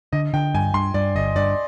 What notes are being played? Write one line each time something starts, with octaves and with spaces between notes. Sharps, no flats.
D3 D#5
D3 G5
G2 G#5
G2 C6
G2 D5
G1 D#5
G2 D5